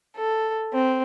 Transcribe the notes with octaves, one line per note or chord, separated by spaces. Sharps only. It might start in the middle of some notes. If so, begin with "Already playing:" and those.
A4
C4